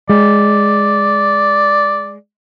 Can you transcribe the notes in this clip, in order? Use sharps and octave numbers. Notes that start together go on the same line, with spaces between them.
G#3 D5